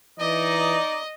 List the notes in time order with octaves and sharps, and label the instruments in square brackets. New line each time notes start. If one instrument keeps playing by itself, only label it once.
[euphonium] E3 [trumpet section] D#4 D5 [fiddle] D#5